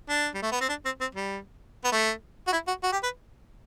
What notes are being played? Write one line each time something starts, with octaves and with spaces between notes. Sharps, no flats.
D4
G3
A3
B3
C4
D4
C4
C4
G3
B3
A3
F#4
E4
F#4
F#4
G4
B4